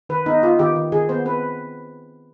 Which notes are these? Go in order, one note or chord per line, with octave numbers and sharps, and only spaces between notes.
D#3 B4
B3 D#4
B3 F4
D#3 G4
D#3
D#3 G#4
B3 C5
C4 B4